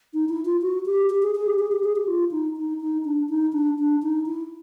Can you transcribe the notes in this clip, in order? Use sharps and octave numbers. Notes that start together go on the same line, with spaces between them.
D#4
E4
F4
F#4
G4
G4
G#4
G#4
G4
G#4
G4
G#4
G4
F4
D#4
D#4
D#4
D4
D#4
D4
D4
D#4
E4